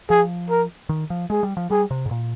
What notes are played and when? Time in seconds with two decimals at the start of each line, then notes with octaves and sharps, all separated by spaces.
0.10 F3 G#4
0.50 A#4
0.89 D#3
1.10 F3
1.30 G#3 G#4
1.43 G3
1.57 F3
1.70 G3 G#4
1.91 C3
2.06 G#2
2.11 A#2